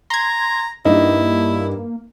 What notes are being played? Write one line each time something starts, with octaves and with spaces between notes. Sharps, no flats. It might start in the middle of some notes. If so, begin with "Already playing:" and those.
A#5 C6 G#6
G2 A#3 D#4 E4